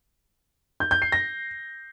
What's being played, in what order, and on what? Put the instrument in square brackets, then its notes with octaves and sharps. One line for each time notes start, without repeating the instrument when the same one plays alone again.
[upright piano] G6
G6
C7
A#6